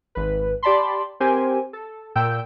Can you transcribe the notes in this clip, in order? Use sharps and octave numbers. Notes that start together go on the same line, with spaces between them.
G#1 B4
G4 D5 A5 B5 C6
C4 G4 A#4 C5 G#5
A4
A#2 G5 E6 G6